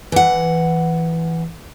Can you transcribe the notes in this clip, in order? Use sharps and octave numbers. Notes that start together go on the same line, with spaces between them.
E3 F#5